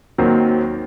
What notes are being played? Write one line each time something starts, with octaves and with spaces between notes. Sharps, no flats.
D#2 D#3 F#3 C4